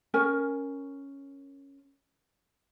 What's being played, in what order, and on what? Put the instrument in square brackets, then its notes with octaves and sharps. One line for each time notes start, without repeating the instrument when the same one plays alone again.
[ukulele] C#4 A#4 G#5